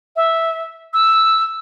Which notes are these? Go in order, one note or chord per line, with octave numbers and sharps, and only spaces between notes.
E5
E6